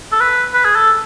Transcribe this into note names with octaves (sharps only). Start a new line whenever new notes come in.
A4
B4
B4
G#4
A4